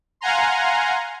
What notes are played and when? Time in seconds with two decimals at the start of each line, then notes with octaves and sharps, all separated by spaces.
0.21 F5 F#5 G#5 A#5 C6